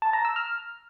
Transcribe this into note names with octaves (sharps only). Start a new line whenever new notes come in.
A5
A#5
E6
F6